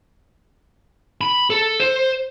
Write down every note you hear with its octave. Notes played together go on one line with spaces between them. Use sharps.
B5
A4
C5